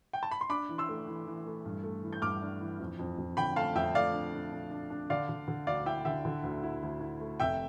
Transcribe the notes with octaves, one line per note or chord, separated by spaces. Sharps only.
G5
A5
B5
C6
D4 B5 D6
E3
C6 E6
A3
E3
E3
A3
G2
A3
E3
G6
G2 D6 F6
D4
E3
F2
F2
F2
D3 G5 B5
A3 F5 A5
F2 E5 G5
A3 D5 F5
D4
D4
D4
D4
D4
D3 D5 F5
D3
D3
D2 D5 F5
E4 E5 G5
D3 E5 G5
D3
D2
E4
D2
E4
A3
F1 E5 G5